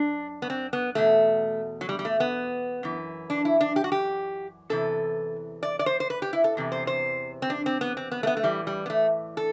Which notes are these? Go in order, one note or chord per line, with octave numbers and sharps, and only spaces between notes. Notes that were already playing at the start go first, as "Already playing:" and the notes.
Already playing: F#2 D4
B3
C4
B3
E2 B2 A3
F#3
G3
G3
A3
B3
F#2 E3
D4
E4
D4
G4
F#4
G4
E2 C3 E3 A4
D5
D5
C5
C5
B4
G4
E4
A4
E2 C3 E3
C5
C5
C4
D4
C4
B3
C4
B3
A3
B3
A3
A2 E3 G3
G3
B3
A3
A4